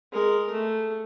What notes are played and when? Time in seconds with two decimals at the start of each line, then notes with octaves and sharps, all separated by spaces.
0.12 G#3 A#4
0.51 A3